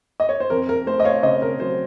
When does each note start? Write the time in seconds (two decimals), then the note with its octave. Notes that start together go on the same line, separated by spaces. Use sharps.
0.20 D#5
0.29 C#5
0.40 C5
0.50 F2 A#4
0.69 A#4
0.87 A3 C5
1.00 D#5
1.04 C#5 F5
1.23 C#3 C5 D#5
1.42 A#4
1.60 F#3 C5